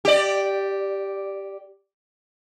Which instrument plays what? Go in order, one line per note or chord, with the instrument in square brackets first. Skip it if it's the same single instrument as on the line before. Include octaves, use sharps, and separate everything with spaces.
[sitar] G4 D5